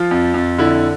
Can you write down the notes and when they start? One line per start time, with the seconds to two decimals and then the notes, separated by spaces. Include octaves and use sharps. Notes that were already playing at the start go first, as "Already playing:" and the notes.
Already playing: F3 F4
0.11 F2
0.34 F2
0.58 D3 E4